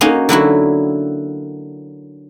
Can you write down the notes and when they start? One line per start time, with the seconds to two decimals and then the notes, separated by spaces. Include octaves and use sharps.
0.01 A#3 C#4 D#4 F#4
0.29 D3 F#3 E4 F#4